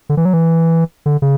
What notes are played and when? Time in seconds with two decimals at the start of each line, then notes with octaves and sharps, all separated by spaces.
0.09 D3
0.17 E3
0.25 F#3
0.33 E3
1.06 D3
1.22 C#3